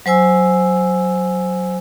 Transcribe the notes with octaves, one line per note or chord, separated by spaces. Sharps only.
F#3 C5 G#5 E6